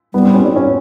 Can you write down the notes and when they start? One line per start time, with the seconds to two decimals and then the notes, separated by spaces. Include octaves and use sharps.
0.14 G3 B3
0.25 C4
0.34 C#4
0.45 D4
0.56 C#4